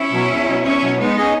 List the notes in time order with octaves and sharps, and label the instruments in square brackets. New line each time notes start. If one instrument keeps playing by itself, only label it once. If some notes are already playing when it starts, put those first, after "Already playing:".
Already playing: [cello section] C#4 E4
[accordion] B2 F#3
E2
B2 F#3
[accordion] E2 [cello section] C#4 E4
[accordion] B2 F#3
[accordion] G#3 [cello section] B3 D#4
[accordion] C#4 G#4 D#5